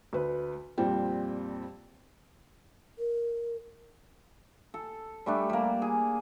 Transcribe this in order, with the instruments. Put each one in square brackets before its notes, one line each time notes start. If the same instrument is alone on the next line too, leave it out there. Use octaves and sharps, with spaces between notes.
[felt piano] D2 B4
F2 A#2 G3 C4
[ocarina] A#4
[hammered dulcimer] A4
G3 A3 D4
G3 A#3
G#4